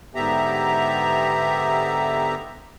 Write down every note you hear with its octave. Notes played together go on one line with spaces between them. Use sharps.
G#2 D3 B3 G4 E5 A#5